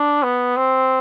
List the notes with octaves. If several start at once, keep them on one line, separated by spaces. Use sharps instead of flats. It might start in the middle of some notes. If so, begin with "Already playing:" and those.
Already playing: D4
B3
C4